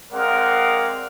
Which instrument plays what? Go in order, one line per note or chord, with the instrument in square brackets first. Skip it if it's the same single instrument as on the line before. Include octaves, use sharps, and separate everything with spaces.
[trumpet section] G#3 C4 A#4 D5 F5 F#5